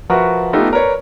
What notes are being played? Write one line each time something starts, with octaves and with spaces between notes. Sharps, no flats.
F3 F#4 A#4 B4 E5 C#6
A3 B3 D#4 F4 G4 A4
A#4 B4 C#5 D5